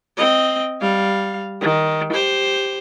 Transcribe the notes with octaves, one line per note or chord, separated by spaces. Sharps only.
C4 D#5
G3 F5
D#3
G4 C5